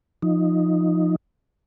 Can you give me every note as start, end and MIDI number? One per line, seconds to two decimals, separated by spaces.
0.22 1.16 53
0.22 1.16 63